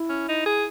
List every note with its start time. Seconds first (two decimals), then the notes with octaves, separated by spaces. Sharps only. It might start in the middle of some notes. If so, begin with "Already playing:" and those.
Already playing: E4
0.09 C#4
0.29 D#4
0.46 G#4